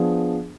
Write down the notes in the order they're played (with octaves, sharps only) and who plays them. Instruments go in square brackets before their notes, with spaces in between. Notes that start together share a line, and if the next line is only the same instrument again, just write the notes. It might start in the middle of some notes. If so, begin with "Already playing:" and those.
Already playing: [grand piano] F3 B3 D4 G#4